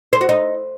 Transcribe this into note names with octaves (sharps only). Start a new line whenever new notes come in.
C5
F#4
D#4